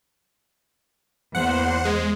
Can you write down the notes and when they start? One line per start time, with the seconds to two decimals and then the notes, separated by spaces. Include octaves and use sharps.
1.35 E2 A#3 C5 F#5
1.85 G#3